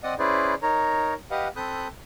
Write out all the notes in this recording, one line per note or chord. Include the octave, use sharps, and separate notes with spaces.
C4 D5 D#5 F#5 D#6
C#4 E4 G#4 B4 C5 D5
D#4 A#4 C#5 A#5
G4 B4 D#5 F5 F#5
C4 A4 B5 D#6 F#6 G6